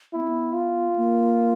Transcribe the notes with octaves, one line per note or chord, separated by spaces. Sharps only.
B3 E4
C4
B3
F4
A#3